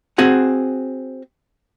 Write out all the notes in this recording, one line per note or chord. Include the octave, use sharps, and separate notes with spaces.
C4 F#4 G#4 F#5